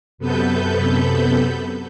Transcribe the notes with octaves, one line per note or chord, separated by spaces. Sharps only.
F#2 C3 B3 A4 B4 G6